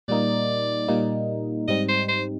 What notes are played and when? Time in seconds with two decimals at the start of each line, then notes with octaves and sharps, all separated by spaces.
0.08 A#2 G3 A#3 D#4 D5
0.88 A#2 G3 A#3 D#4
1.68 G#2 G3 C4 D#4 D#5
1.89 C5
2.08 C5